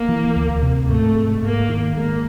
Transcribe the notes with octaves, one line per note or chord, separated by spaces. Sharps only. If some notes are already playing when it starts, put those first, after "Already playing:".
Already playing: A#3
E3
D2
C3
G#2 A3
G#3
G#2 A#3
D#3
G#3 A#3